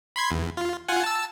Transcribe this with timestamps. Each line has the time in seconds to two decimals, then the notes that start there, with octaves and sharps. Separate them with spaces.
0.16 B5 C6 G#6
0.31 E2
0.57 F4
0.88 F4 F#5 G#5
1.03 A5 E6